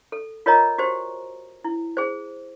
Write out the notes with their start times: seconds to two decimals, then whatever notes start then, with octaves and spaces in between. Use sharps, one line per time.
0.12 A4
0.46 F4 A#4 C#5 D#5 A#5
0.78 F#4 G4 C5
1.64 E4
1.97 G#4 C5